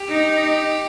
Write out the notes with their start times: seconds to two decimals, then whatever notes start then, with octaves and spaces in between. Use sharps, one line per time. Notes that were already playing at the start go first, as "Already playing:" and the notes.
Already playing: G4
0.10 D#4